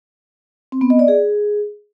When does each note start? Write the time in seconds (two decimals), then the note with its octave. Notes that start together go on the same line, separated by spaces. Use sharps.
0.72 C4
0.81 B3
0.90 D#5
0.99 D5
1.08 G#4